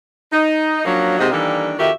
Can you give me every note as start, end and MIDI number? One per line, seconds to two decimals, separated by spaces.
0.32 0.81 63
0.85 1.18 53
0.85 1.18 54
0.85 1.18 58
0.85 1.18 61
0.85 1.18 62
1.18 1.29 44
1.18 1.29 48
1.18 1.29 58
1.18 1.29 66
1.18 1.29 72
1.18 1.29 75
1.31 1.73 51
1.31 1.73 52
1.31 1.73 55
1.31 1.73 58
1.31 1.73 62
1.31 1.73 69
1.78 1.90 41
1.78 1.90 51
1.78 1.90 66
1.78 1.90 67
1.78 1.90 76